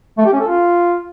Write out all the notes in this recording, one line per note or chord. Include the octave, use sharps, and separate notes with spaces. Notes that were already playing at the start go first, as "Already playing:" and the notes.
A3
G4
C#4
A4
F4